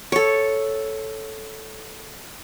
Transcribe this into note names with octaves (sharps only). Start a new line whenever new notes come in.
A4 C#5